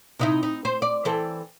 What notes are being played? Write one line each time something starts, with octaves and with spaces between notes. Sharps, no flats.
C3 D#4 E4
D#4
C5
D5
E3 C4 A4